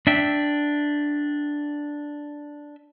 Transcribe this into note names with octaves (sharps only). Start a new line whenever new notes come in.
D4 E5 G5